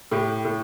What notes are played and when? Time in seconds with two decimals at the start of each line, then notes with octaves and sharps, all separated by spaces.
0.11 A2 G4
0.45 A2